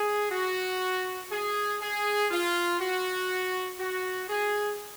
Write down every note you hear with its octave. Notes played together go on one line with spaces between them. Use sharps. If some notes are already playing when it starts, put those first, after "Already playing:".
Already playing: G#4
F#4
G#4
G#4
F4
F#4
F#4
G#4